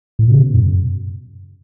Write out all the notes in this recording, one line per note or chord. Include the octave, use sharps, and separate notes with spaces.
A2
B2
C#3
B2
F#2